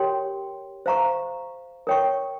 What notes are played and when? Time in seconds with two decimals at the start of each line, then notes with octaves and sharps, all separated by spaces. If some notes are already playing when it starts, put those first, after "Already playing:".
Already playing: G4 A#4 C#5 G5 C6
0.86 C5 F5 A#5 C#6
1.87 A#4 C#5 G5 C#6